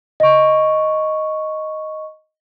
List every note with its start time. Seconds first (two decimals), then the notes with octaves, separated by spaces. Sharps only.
0.20 D#5 C#6